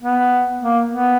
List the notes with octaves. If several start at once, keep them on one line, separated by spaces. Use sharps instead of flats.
B3
A#3
B3